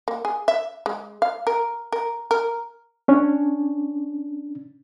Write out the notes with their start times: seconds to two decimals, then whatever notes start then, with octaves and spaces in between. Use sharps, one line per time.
0.08 A#3
0.25 G#4
0.48 E5
0.86 G#3
1.22 F5
1.47 A#4
1.92 A#4
2.31 A#4
3.08 C#4 D4